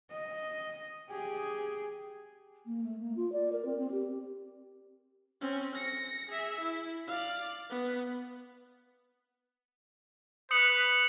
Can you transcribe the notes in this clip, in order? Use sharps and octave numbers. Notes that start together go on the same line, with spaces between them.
D#5
G4 G#4
A#3
A3
A#3
F4
D5
A#4
C4
C4
G4
C4 C#4
A#6 C#7
G#4 E5
E4
D5 F5
B3
B4 D#6 C#7 F#7